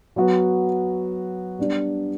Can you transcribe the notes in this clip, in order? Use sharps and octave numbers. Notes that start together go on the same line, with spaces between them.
F#3 B3 F#4
G3 B3 D4